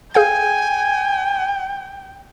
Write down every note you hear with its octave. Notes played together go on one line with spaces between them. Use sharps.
G#4 F5 G5 G#5 G6